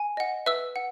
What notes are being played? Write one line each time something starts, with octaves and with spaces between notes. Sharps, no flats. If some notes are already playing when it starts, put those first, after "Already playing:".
Already playing: G#5
D#5 F#5
B4 E5 E6
F#5